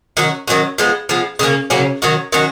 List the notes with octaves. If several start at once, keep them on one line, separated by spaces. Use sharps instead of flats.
D#3 F#3 C#4 F#4
D#3 F#3 C#4 F#4
F3 G#3 B3
F3 G#3 B3
C#3 F#3 A#3 C#4
C#3 F#3 A#3 C#4
D#3 F#3 C#4 F#4
D#3 F#3 C#4 F#4